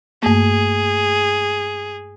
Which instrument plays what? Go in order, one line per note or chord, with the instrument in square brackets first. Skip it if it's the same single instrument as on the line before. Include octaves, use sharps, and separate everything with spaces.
[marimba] G2 A3 A#3 [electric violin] G#4